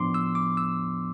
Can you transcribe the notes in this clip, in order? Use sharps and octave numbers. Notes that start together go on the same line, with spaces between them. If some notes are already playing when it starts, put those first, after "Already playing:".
Already playing: A2 F3 B3 D4 C6 D6
E6
D6
E6